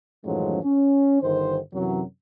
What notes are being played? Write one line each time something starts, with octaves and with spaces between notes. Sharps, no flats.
A1 F#2 D#3 F3 F#3 G#3
C#4
G1 D#3 C5
F#2 C3 E3 F#3